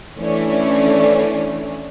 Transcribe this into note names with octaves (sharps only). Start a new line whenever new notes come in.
E3 A3 C#4 D4